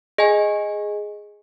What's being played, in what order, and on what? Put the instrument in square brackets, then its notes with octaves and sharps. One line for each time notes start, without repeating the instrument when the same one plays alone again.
[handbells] G#4 D#5 G#5